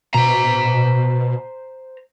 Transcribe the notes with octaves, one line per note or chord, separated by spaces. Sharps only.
B2 C5 A#5